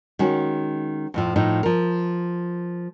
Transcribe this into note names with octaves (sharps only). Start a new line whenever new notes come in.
D#3 G#3 C#4 F#4
F2 A2 F3
A2 F3 D#4
F3 A#4